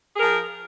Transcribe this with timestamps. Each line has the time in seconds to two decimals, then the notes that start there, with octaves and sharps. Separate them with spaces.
0.15 G#4
0.18 A#4
0.20 F3